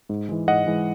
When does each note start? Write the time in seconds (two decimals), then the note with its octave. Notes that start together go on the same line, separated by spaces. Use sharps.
0.09 G#2
0.29 E3 G#3
0.48 G#2 D#5 F#5
0.67 E3 G#3